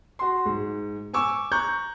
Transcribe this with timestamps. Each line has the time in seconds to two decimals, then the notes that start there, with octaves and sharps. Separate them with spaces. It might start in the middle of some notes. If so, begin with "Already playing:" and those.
0.19 F#4 C6
0.46 G#2
1.14 G#5 C#6 D6 E6
1.52 A#5 C#6 F#6 G6